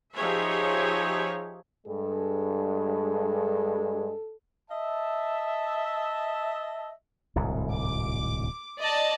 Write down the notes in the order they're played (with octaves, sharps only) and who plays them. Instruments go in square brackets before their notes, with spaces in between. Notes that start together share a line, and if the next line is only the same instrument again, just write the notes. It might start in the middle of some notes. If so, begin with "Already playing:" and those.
[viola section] F3 D#4 G4 G#4 C#5 E5
[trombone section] G2 G#3 [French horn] A4
[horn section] D#5 E5 A5
[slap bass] D1 C2 G#2
[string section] D6
D5 D#5 A5